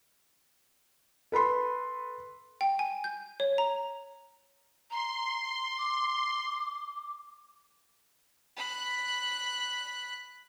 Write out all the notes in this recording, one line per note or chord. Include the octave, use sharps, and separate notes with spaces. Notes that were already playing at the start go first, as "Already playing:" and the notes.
A4 B4 B5 C6
G5
G#5
G6
C#5
A#5
A#5 C6
D6
B5 F#6